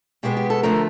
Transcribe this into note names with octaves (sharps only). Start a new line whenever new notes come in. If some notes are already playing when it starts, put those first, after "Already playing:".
B2 G#3 B3 G4
G4
A4
D3 F3 A3 A#4